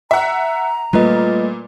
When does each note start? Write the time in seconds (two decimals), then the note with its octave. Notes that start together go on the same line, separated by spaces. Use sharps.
0.11 E5 F#5 A#5
0.93 A#2 G3 A3 A#3 F4 B4 D#5